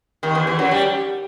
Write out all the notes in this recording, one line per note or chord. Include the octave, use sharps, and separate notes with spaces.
D#2 D#3
E2 E3
E2 E3
F#2 F#3
G3